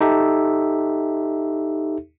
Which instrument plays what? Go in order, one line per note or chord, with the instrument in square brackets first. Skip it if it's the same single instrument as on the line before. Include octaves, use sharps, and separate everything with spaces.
[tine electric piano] D#4 G4 A4 E5